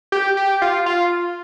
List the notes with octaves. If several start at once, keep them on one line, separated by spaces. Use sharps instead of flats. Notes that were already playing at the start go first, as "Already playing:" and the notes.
G4
G4
F4
F4